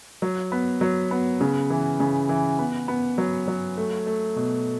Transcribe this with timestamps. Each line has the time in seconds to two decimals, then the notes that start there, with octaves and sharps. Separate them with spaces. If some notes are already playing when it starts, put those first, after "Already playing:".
0.22 F#3
0.52 B3
0.81 F#3
1.11 B3
1.41 C#3
1.70 E3
2.00 C#3
2.29 E3
2.59 B3
2.88 B3
3.18 F#3
3.48 F#3
3.77 A3
4.06 A3
4.36 B2